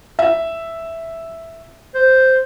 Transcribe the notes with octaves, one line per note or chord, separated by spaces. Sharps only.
E5
C5